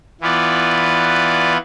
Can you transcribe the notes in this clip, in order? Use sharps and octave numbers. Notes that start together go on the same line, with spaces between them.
E3 B3 F4 B4 D5